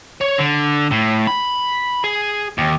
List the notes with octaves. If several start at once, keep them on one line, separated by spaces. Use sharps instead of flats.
C#5
D3
A2
B5
G#4
D#2